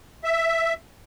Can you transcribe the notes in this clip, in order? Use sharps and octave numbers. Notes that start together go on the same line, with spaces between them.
E5